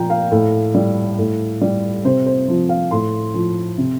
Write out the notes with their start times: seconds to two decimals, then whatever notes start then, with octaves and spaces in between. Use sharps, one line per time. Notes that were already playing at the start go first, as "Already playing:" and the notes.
Already playing: A#2 F3 G5 A#5
0.10 F5
0.31 A2
0.75 G3
1.18 A2
1.61 G3
2.05 C3 C5
2.26 C5
2.48 F3
2.69 F5
2.91 A2 C6
3.34 F3
3.78 C3